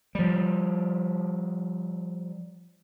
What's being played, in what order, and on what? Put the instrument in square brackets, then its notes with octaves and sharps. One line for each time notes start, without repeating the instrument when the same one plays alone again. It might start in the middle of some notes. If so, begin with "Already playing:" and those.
[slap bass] F3 G3